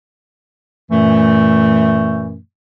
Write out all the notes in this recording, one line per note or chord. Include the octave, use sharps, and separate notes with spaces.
F#2 A#2 E3 A3